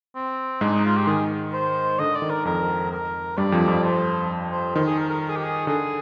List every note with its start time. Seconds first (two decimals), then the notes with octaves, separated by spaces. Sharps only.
0.15 C4
0.61 G#2 G#3 D4
0.73 D#4
0.84 F4
0.96 G4
1.07 D#3 G#4
1.53 C5
1.99 D3 D#5
2.15 D5
2.22 D#3
2.30 A#4
2.45 F2 F3 A#4
2.91 A#4
3.37 G2 G3 D5
3.52 F2 F3
3.67 F2 F3
3.84 C5
4.52 C5
4.75 D#3 C5
4.86 G#4
4.98 A#4
5.09 A#4
5.21 A#4
5.29 G#4
5.36 G4
5.44 G#4
5.67 D3 G#4